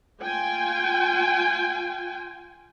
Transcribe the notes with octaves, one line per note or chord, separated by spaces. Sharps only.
F4 G5 G#5